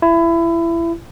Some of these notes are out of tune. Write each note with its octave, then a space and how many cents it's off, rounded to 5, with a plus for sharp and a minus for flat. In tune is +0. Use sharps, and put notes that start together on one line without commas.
E4 +25